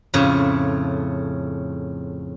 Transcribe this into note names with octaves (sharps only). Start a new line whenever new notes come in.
F2 A2 C#3